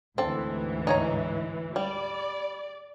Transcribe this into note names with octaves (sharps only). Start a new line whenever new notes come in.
D2 G#2 E3 C4 A4
D#4 C#5 A#5
G3 D5